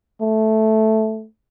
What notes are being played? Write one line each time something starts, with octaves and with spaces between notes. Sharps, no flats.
A3